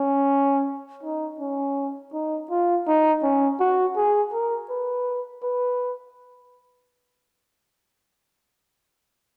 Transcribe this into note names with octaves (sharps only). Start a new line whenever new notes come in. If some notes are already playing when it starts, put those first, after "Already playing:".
Already playing: C#4
D#4
C#4
D#4
F4
D#4
C#4
F#4
G#4
A#4
B4
B4